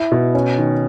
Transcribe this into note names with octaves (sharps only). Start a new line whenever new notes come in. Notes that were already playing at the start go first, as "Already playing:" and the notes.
Already playing: E4
B2
C#4
D#3